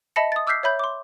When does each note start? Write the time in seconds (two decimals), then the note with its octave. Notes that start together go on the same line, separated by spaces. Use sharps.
0.16 D#5 E5 A5 B5 A#6 C#7
0.32 D#6 A6
0.47 D6 E6 F6 G6 B6 C7
0.63 C#5 E5 B5 G6
0.79 C6 D6